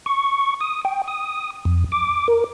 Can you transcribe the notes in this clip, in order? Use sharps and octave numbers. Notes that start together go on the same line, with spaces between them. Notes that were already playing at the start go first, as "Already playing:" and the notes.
C#6
D#6
G5
D#6
F2
D6
A#4